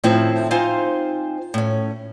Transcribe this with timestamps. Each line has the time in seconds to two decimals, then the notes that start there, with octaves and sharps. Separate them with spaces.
0.04 A2 D#3 F3 C4 E4
0.51 C4 D#4 F4 C5 F5 G#5
1.54 A2 C#4